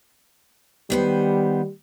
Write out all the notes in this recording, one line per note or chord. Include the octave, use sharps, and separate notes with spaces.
D#3 G3 B3 C5